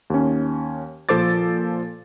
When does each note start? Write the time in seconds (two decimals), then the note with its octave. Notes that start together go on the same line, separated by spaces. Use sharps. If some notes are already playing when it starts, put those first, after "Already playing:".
0.10 D#2 C#4
1.09 A#2 F3 A4 C5 D6 A6